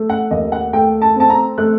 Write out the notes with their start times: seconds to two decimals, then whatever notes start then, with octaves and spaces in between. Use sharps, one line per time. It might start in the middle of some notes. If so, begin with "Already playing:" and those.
Already playing: A3
0.10 F#5
0.31 D#2 D#5
0.52 F#5
0.73 A3 G5
1.02 A5
1.16 C4 A5
1.30 A#5
1.58 A3 F#6